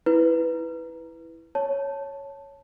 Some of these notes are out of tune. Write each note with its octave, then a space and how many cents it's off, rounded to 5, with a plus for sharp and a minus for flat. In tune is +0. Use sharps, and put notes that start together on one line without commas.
E4 -5 B4 +0
C#5 +0 A5 +0